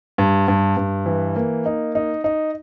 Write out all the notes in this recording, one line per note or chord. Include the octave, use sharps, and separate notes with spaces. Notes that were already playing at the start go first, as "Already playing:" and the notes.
G2
G2
G2
E3
A#3
D#4
D#4
D#4